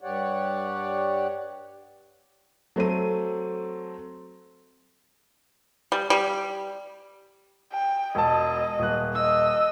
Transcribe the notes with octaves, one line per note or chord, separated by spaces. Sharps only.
G2 G4 C#5 D5 F#5
F#3 A3 C4 A4 D#7
G3
G3
G5
E1 D#5 A5
D#1 F#6
D#5 E6